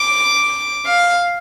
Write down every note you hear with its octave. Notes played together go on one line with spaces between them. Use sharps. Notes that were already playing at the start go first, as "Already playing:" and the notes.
Already playing: D6
F5